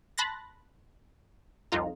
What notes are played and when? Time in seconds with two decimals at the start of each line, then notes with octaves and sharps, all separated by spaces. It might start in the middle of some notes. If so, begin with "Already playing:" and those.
0.18 A5 B5 C6 F#6 A6 A#6
1.72 C2 F2 D#4 F4 A#5